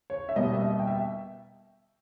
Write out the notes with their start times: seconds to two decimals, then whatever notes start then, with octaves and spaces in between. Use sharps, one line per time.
0.10 C#5
0.29 E5
0.36 B2 G3 A#3 D#5
0.53 E5
0.62 D#5
0.79 G5
0.87 E5